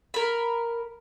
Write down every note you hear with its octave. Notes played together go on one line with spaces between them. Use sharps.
A#4 B5